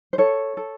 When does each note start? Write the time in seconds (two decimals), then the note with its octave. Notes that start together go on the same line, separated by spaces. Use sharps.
0.13 C5
0.18 A4 C#5
0.57 A4